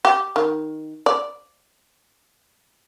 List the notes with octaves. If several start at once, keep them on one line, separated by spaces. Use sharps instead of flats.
G4
D#3
D5